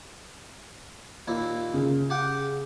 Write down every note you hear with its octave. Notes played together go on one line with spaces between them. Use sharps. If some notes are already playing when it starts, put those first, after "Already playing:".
D#2 A#2 E4
C#3
G4 F#5 G5